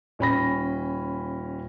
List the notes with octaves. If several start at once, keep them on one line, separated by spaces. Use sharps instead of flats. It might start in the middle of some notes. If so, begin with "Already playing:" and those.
D#1 C#4 B5 A#6